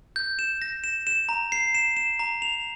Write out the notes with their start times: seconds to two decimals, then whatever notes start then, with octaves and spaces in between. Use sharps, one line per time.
0.16 G6
0.39 E7
0.62 A#6
0.84 E7
1.07 E7
1.29 A#5
1.52 C7
1.75 E7
1.97 E7
2.19 A#5
2.42 F7